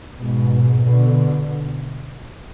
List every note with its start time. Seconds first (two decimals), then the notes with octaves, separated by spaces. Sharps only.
0.17 G#2 B2
0.85 B2 D3